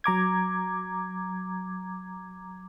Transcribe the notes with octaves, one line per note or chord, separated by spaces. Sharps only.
F#3 A#5 D6 G#6